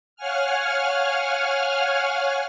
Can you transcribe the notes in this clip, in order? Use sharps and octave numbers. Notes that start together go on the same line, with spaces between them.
C#5 F5 F#5 G#5 F6